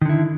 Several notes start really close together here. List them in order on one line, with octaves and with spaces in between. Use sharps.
D#3 D3 E4